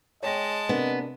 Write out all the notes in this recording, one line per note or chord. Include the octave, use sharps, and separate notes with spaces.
G#3 C#5 D#5 G5 A5 A#6
C3 B3 D4 A#4